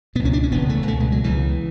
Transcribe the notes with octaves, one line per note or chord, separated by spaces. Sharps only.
C#2 B2 B3
C#4
D4
C#4
E1 D2 C#3 B3
A3
C#2 B2 A3
G#3
F#3
C#2 C#3 E3